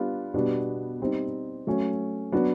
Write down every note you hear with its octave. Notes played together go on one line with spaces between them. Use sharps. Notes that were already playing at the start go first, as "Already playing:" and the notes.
Already playing: G3 B3 D4 F4
B2 G3 B3 D4
G3 C4 D#4
F#3 A3 C#4
F#3 B3 D4 F#4